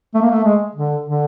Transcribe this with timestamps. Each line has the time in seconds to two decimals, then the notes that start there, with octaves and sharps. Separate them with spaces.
0.14 A3
0.22 A#3
0.31 A3
0.44 G#3
0.75 D3
1.06 D3